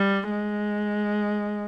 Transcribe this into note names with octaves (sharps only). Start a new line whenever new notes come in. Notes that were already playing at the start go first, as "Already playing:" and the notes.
Already playing: G3
G#3